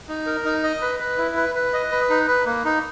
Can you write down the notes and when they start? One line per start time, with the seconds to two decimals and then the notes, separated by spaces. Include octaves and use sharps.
0.09 D#4
0.26 A#4
0.45 D#4
0.63 D#5
0.81 B4
1.00 B4
1.18 E4
1.36 B4
1.55 B4
1.73 D#5
1.91 B4
2.10 D#4
2.28 B4
2.46 A#3
2.65 D#4